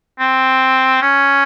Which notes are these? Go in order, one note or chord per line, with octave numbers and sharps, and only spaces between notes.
C4
C#4